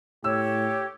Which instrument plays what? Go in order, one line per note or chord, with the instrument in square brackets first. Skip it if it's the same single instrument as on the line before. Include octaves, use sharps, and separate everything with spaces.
[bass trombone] A2 [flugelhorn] G4 [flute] C#5 [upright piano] E6